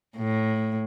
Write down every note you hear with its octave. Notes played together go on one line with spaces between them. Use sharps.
A2